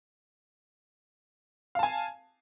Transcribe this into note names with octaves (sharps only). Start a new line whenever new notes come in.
F5 G#5 A5